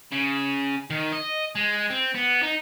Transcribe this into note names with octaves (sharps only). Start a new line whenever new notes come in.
C#3
D#3
D#5
G#3
C4
B3
D#4